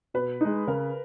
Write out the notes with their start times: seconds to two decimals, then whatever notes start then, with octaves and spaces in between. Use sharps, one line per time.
0.14 B2 B4
0.41 G#3 D#4
0.67 C#3 A#4